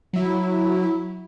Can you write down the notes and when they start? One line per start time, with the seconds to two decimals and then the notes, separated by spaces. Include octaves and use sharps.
0.13 F#3 E4